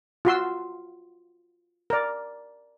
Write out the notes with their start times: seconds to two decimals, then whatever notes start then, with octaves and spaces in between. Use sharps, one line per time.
0.25 F4 F#4 C6 E6
1.90 A#4 D5